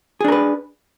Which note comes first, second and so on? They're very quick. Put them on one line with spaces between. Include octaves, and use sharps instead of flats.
G#4 D4 A#4 B4